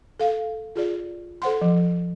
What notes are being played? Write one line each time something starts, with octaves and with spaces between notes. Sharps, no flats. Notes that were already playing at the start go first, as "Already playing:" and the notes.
A4 F5
F4 G#4 D5
A4 C5 F#5 C6
F3